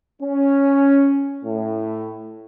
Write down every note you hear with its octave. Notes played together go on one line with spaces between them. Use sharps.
C#4
A2